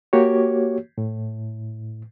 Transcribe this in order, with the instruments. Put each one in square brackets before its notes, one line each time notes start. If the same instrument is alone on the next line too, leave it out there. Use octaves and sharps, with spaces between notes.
[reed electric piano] A#3 F#4 G4 C#5
A2